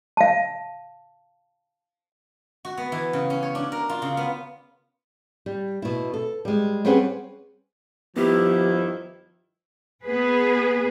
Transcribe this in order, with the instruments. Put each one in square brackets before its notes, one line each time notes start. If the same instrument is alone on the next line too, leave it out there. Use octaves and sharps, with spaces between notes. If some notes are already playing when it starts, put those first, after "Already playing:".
[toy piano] F5 A5
[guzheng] F#4
B3
E3
C#3
C#4
C#5
D4
A#4
F4
C#3
B3
[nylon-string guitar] G3
B2 E4
A4
G3 G#3
G3 C4 C#4 G#4 B4 F#5
[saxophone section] G2 D#3 E4 [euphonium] F3 [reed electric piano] B3 [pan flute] G4
[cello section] B3 G#4 B4